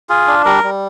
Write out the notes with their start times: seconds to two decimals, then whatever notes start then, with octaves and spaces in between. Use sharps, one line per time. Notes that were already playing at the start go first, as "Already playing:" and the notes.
0.10 F4 G#4
0.27 D4
0.45 G3 A#4
0.63 G3